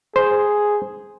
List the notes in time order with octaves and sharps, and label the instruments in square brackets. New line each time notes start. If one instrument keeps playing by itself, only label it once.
[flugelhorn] G#4 [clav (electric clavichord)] C5